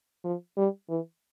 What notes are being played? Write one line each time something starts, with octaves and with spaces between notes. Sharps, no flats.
F3
G3
E3